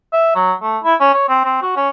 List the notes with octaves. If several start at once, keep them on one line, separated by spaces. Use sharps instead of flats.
E5
F#3
A3
E4
C#4
C#5
C4
C4
F#4
C#4